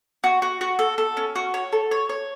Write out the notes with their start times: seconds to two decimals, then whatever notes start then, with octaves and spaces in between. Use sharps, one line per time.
0.24 F#4
0.42 F#4
0.61 F#4
0.79 A4
0.98 A4
1.17 C#4
1.36 F#4
1.54 C#5
1.73 A4
1.91 C#5
2.09 C#5